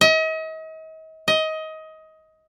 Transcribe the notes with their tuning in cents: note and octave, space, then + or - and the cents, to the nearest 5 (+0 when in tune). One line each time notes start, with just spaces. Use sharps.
D#5 +40
D#5 +20